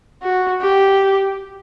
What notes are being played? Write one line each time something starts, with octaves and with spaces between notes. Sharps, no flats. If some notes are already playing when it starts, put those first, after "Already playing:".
F#4
G4